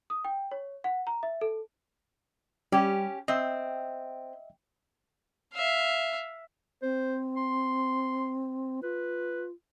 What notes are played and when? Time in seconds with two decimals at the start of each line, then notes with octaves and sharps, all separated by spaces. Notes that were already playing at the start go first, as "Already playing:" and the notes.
0.10 D#6
0.25 G5
0.51 C#5
0.84 F#5
1.07 A#5
1.23 E5
1.41 A4
2.72 G3 C#4 G4
3.28 C4 D#5 E5
5.54 E5 F5
6.82 C4 C5
7.37 C6
8.83 F4 B4